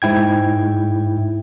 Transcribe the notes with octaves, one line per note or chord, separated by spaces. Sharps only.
G#2 E4 G5 G#6